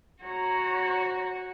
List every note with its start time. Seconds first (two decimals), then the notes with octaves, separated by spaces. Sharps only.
0.23 F#4 C#5 A#5